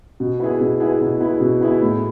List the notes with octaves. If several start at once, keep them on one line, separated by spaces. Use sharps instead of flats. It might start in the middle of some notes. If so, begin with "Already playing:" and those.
B2
B3 E4 G#4
B2
B3 E4 G#4
B2
B3 E4 G#4
B2
B3 E4 G#4
A2